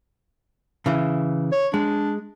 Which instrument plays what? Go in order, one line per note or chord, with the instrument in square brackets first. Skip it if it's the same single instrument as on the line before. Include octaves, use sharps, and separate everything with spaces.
[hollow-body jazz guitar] C#3 E3
[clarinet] C#5
[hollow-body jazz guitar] G#3 [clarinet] D4